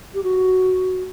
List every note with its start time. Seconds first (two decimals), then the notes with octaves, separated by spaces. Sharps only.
0.14 G4
0.24 F#4